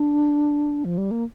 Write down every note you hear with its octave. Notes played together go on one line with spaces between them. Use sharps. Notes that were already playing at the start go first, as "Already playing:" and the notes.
Already playing: D4
F3
G3
A#3